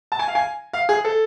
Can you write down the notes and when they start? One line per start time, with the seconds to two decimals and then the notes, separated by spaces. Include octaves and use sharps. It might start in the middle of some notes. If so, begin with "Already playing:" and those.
0.12 A5
0.19 G#5
0.28 F5
0.35 G#5
0.73 F5
0.89 G#4
1.05 A4